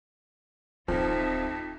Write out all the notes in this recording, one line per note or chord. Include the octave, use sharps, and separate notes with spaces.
D1 F2 F3 D#4 F4 E5